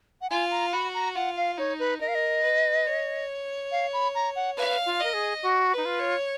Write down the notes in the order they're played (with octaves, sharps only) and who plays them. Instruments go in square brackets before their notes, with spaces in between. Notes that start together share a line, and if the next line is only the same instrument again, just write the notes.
[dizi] F#5
[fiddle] F4 [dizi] G#5
[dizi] A#5
[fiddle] F#4 [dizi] B5
[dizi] A#5
[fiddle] F4 [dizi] F#5
[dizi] F5
[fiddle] D#4 [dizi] C#5
[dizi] B4
[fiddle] A#4 [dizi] D#5
[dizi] F5
D#5
[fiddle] B4
C#5
[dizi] F5
B5
A#5
F#5
[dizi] B4 [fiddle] F5
[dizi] F4
[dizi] A#4 [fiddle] D#5
[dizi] G#4
F#4
[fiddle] B4
[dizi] D#4
F4
[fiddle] C#5